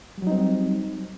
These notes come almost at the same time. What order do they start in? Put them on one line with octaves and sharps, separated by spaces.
G3 F#3 D#4 C4